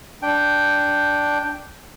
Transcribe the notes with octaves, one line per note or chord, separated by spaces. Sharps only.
D4 G5